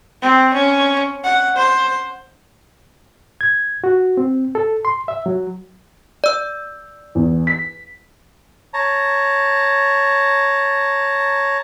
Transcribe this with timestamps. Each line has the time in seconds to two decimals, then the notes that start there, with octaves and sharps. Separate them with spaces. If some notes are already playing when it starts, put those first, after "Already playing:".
0.22 C4
0.54 C#4
1.24 F#5
1.56 C5
3.41 G#6
3.84 F#4
4.17 C4
4.55 A4
4.85 C6
5.08 E5
5.26 F#3
6.24 D5 E6
7.15 E2
7.47 B6
8.74 C#5 A5 A#5